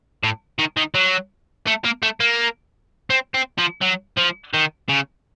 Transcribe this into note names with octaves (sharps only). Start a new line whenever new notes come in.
A2
D#3
D#3
F#3
A3
A#3
A3
A#3
C4
C4
F3
F#3
F3
D#3
C#3